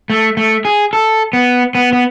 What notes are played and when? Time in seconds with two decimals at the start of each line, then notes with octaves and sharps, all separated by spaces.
0.10 A3
0.37 A3
0.65 G#4
0.93 A4
1.33 B3
1.75 B3
1.93 B3